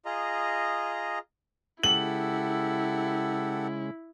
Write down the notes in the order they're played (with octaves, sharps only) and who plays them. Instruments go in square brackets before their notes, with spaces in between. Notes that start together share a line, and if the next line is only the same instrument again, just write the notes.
[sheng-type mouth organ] F4 G#4 D#5 A#5
[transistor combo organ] C#3 G#3 [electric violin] E4 [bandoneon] G4 A4 F#5 [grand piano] F#7